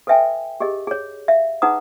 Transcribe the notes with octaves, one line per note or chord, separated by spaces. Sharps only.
A4 B4 D#5 E5 G5 G#5
G4 G#4 A#4 D#5
G#4 C#5
E5 F5
D#4 G#4 B4 F#5 A#5 D#6